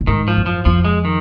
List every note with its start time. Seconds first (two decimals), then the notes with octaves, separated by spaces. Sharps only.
0.01 A#2
0.07 G#2 D#3
0.28 F3
0.37 F#2
0.46 F3
0.65 F2 F3
0.85 G#3
1.05 D#3